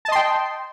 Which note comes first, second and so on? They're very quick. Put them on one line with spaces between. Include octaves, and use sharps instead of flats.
A5 D#5 C6 G5